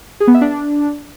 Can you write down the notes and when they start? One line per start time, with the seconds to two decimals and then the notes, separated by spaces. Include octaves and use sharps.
0.20 G#4
0.27 B3
0.34 E5
0.41 D4